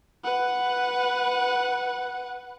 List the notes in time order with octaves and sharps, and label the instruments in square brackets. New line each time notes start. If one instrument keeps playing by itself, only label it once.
[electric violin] B4 F#5